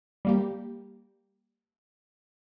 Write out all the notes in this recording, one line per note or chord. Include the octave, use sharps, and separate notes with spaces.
G3 A#3 G4